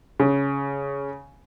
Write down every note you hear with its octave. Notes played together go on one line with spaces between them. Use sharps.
C#3